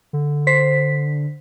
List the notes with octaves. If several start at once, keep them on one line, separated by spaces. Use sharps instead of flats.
D3
C5 B6